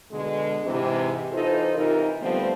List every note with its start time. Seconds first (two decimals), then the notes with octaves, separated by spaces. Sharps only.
0.12 B2 D3 G#3
0.65 G#2 C3 E3
1.32 E3 D#4 F4 A4 C5
1.75 C3 E3 D#4 F4 A#4
2.21 D3 F3 G3 A3 B3 C4